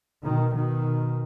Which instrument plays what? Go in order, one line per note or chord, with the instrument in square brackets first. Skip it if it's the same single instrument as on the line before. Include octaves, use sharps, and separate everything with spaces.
[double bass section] B2 D#3
B2 D#3